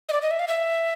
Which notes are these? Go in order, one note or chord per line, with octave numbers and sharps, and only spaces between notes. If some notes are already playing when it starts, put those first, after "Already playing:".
D#5
D5
D#5
E5
F5
E5